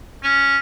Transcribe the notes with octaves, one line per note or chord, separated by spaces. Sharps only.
C#4